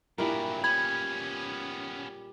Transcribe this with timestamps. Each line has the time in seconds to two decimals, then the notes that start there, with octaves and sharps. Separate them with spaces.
0.18 G2 A#2 F#3 G3 E4 G#4 A#4
0.64 B3 C#4 B5 G#6